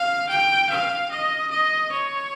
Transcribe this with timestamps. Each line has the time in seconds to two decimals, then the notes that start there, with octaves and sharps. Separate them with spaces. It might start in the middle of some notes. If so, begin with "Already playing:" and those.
Already playing: F5
0.29 G5
0.70 F5
1.11 D#5
1.51 D#5
1.92 C#5